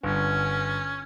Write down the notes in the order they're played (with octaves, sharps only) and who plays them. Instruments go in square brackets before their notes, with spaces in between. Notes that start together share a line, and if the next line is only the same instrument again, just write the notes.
[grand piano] G1 [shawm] C#4